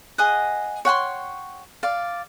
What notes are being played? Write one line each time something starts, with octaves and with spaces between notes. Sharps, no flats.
G#4 D#5 F#5
C#5 F#5 G5 C6
D5 F5